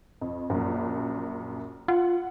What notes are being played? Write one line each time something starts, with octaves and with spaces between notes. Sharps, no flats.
F2
A#1 F#2
F4 F#5